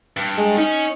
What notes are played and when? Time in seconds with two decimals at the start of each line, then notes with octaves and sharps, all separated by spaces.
0.17 G2
0.38 G#3
0.58 C#4 D#4